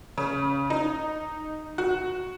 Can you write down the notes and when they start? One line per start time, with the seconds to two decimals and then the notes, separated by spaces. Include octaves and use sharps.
0.18 C#3
0.70 D#4
1.78 F#4